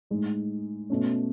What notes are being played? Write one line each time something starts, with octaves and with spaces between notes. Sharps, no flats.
A2 G#3 D#4
B2 A3 C#4